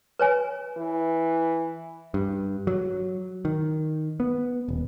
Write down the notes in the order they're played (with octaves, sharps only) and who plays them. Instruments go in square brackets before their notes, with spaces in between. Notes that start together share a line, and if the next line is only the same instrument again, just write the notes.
[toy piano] B4 C#5 G#5
[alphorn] E3
[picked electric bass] G2
F#3
D#3
B3
D#1